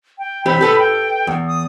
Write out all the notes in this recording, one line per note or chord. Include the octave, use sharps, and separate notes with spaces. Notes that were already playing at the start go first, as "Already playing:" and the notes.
G5
E3 C4 G4 B5
G4 A4 B4
G5
E2
D#6